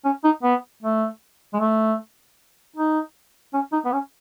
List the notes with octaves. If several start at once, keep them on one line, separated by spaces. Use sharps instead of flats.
C#4
D#4
B3
A3
G#3
A3
D#4
C#4
D#4
B3
C#4